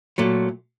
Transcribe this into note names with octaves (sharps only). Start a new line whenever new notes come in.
A#2 F#3 A3